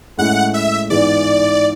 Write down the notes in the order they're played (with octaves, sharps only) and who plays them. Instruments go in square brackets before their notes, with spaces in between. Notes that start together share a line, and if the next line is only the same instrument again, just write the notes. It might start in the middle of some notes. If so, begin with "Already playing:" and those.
[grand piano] A2 G#3 C#4 E4 [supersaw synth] F#5
[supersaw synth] E5
[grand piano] G#2 E3 B3 E4 G#4 [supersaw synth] D5